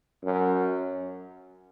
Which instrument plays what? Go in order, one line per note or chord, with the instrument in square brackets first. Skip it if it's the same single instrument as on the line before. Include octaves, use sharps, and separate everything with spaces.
[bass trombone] F#2